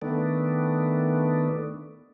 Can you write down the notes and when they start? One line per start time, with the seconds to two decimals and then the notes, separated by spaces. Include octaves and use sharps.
0.02 D#3 A3 B3 D4